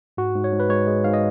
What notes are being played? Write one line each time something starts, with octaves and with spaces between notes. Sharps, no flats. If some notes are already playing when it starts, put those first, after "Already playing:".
G#2 F#4
G#2
C#5
G#2
B4
G#3 C#5
G#3
G#2 F5
D#5